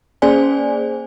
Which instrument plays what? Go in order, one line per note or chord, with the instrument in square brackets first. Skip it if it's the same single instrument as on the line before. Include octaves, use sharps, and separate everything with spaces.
[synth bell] A#3 C#4 G#4 C5 D5 G#5